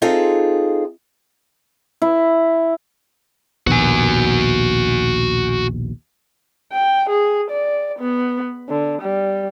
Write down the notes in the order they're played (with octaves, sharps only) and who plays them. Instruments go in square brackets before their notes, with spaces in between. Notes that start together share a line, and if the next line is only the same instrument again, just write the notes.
[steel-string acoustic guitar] C4 D#4 F4 G#4 A4
[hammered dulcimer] E4
[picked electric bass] A#1 D#2 B2 [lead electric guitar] F#4 G#5
[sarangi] G5
G#4
D5
B3
D3
G3